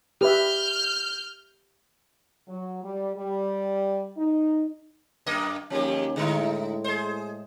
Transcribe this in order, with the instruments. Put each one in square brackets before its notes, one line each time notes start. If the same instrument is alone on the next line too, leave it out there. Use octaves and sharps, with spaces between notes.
[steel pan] G4 B4 E5 [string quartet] F6 G6
[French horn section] F#3
G3
G3
D#4
[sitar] F#2 A#3 D#5
[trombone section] D#2 C#4 D#4 [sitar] F3 G#3 G4
[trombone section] A2 G#3 [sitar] D3 D#4 E4
[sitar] G#4 C5